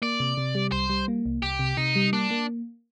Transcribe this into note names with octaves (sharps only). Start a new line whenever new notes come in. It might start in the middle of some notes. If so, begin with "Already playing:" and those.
A#3 D5
C3
C3
G3
C2 C5
G3
A#3
C2
C2 G4
C3
C3 D#4
G3
A#3 D4
A#3